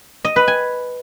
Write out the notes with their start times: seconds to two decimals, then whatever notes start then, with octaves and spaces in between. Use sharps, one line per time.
0.24 D#5
0.36 B4
0.48 G#5